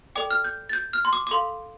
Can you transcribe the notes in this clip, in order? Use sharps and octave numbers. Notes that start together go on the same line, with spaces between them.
A4 D5 G5 D6
F6
G6
A6
G6
F6
C6
D6
D6
A4 F5 C6